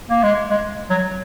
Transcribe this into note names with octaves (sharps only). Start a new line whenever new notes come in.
A#3
G#3
G#3
F#3